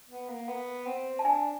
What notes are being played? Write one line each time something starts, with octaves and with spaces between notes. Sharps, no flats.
B3
A#3
B3
C4
A5
D4 G#5